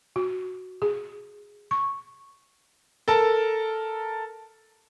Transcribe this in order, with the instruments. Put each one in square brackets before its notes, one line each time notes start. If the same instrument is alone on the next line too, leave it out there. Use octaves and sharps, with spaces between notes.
[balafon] F#4
G#4
C#6
[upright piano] A4 A#4 A5